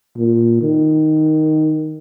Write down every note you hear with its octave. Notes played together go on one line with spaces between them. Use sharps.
A#2
D#3